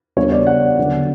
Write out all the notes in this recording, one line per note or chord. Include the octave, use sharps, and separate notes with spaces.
C#3 G3 B3 D4 C#5
D5
F#5
D3 F#3 B3